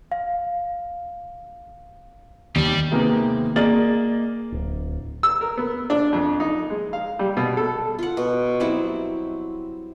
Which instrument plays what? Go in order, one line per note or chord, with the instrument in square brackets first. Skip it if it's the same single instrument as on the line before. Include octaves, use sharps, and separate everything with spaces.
[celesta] F5
[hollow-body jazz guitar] D#2 [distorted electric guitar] G3
[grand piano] C3 D#3 G#3 A#3 B3
A#3 G#4 D5 D#5 A6 F#7
[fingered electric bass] D1
[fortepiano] E6
A#4
B3
D4
F2
D#4
G#3
F5
G3
B2
A4
[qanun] F4 F#5
B2
F#3 G3 C4 E4